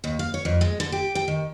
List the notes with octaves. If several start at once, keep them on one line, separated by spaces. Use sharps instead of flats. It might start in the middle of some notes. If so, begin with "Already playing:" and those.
D#2
F5
C#5
F2
G#3
D3
G4
G5
D#3